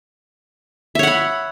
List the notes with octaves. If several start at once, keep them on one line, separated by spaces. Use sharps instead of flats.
C#5 E5 F#5 B5